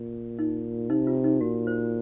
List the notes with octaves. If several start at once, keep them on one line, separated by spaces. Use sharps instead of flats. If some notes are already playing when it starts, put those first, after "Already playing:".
Already playing: A#2
D#4
C3 D#4
F4
D#4
A#2 F#4
C5